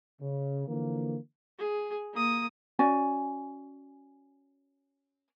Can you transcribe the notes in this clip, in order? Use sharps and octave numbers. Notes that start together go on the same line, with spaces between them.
C#3
D3 E3 F3 A#3
G#4
A#3 D#6
C#4 F#4 D5 G#5